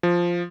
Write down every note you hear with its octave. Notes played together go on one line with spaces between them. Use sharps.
F3